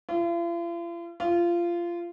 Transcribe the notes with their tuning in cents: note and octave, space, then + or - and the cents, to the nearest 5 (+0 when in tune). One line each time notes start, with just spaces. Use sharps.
F4 -45
F4 -20